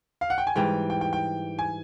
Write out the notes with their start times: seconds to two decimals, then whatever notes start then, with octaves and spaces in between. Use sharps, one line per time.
0.21 F5
0.30 F#5
0.38 G5
0.47 G#5
0.56 G#2 E3 G3 G5
0.90 G5
1.01 G5
1.13 G5
1.59 G#5